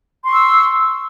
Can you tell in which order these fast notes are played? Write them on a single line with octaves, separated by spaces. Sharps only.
C6 C#6 E6